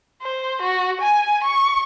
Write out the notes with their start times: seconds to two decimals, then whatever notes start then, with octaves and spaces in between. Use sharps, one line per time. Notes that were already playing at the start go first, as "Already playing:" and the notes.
0.22 C5
0.62 F#4
1.01 G#5
1.44 C#6